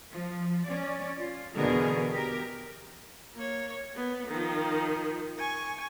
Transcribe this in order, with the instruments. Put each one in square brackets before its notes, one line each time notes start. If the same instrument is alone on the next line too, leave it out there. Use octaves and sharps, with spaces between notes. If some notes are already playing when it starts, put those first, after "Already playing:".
[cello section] F3
C#4 D5
F4
E2 B2 D3 G#4 A#4
G4 A#4
[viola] A#3 C#5
B3
D#3 F3
G#5 C#6